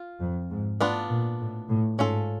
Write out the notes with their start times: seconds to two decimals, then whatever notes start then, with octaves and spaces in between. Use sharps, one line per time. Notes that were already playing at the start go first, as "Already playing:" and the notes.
Already playing: F4
0.21 F2
0.51 G#2
0.80 A2 B3 D4 F4
1.09 A#2
1.40 A2
1.69 A2
1.98 G#2 C#4 F4 A4